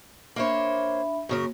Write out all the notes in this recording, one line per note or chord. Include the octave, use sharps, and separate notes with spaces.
A#3 D4 C5 C#5 E5 B5
F#2 C#3 A#3 A#4